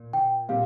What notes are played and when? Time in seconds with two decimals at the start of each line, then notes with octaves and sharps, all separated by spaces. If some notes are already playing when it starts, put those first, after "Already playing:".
Already playing: A#2
0.13 G5
0.48 A#2 G3 C4 G4 F5